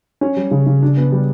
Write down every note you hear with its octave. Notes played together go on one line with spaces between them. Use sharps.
C#4
G3
C#3
C#3
D4
B3
G3